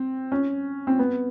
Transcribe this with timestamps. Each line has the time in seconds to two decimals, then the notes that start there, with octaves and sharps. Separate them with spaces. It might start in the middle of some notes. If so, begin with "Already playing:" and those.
Already playing: C4
0.32 C#4
0.87 C4
0.99 B3